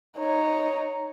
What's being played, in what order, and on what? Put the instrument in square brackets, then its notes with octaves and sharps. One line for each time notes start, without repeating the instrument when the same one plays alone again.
[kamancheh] D#4 C#5